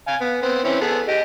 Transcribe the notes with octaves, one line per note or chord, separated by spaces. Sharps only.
F5 G#5
B3
B3 C4
E3 C4 C#4
B3 G#4 A4
G4 D#5